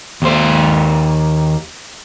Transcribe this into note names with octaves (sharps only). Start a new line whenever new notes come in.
D#2 C5